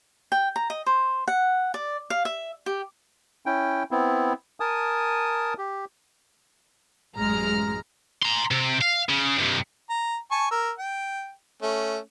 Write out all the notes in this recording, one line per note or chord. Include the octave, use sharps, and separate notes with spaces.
G5
A#5
D#5
C5
F#5
D5
F5
E5
G4
C#4 E4 G5
B3 C4 E4
A#4 G#5 A5 D#6
G4
A1 F#2 G#3 A#5 F6
A#5 C6
C3
F5
C#3
G2 C3
A#5
G#5 A5 C#6
A#4 E6
G5
A3 C#4